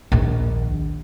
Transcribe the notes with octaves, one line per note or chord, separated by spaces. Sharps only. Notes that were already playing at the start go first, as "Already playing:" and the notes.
A#1 D#2